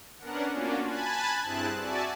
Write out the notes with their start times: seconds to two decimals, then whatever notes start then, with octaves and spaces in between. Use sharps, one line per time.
0.19 B3 C#4 D4 A#4 F#5
0.52 A#3 C#4 D4 F4 F#4
0.86 G#5 A5 B5 F#6 G#6 A6
1.44 G2 C4 E4 G#4 A5 F#6
1.79 F#4 D5 E5 G#5 A5